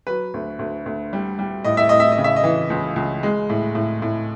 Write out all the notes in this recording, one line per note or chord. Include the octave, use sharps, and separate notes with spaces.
F#3 B4
D2
D2
D2
G3
G3
A2 D#5
E5
A2 D#5
E5
D#5
C#3
E5
D#5
E3
C#2
C#2
G#3
A2
A2
A2